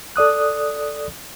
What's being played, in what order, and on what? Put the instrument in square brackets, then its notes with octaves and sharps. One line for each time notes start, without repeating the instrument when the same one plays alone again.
[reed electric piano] A4 D5 D#6 F#6